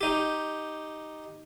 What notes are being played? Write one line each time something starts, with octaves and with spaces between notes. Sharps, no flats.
D#4 G4